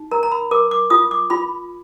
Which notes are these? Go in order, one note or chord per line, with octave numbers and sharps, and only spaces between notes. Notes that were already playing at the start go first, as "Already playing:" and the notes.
Already playing: D#4
A#4 A#5
A#5
B5
A#4 D6
D6
F4 D#6
D6
F4 B5